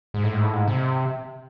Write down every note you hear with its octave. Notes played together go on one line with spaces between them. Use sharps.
G#2
A2
G#2
A2
G#2
C3